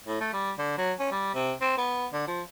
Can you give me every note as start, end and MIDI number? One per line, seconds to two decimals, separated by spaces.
0.07 0.20 45
0.21 0.29 57
0.33 0.51 55
0.59 0.74 50
0.78 0.93 54
0.99 1.11 61
1.12 1.34 55
1.34 1.54 48
1.61 1.73 60
1.78 2.06 59
2.13 2.25 50
2.28 2.42 53